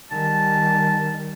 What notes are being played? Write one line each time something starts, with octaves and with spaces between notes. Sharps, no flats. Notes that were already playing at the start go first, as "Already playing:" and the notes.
D#3 G3 A5